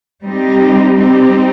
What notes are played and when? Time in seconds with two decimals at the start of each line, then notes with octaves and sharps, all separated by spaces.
0.23 G3 C4 D#4 G4
0.97 G3 C4 D#4 G4